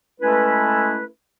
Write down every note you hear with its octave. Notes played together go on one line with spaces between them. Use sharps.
G#3 A3 C#4 E4 A4 B4